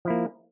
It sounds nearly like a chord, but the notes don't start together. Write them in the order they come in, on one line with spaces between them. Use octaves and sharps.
F3 E4 A#3